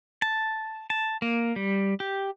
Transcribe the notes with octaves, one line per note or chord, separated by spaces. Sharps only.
A5
A5
A#3
G3
G4